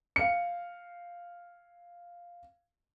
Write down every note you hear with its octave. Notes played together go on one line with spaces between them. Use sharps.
F5 C#7